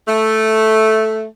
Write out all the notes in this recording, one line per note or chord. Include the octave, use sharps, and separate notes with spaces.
A3